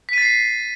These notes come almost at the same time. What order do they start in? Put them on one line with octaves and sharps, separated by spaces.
B6 D#7 A6 C7